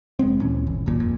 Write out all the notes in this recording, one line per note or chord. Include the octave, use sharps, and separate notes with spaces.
F1 G#3 B3 C4
D2 A#2 E3 C#4
G1
D1 G#1 D#2 A#2
G1 F2 A#2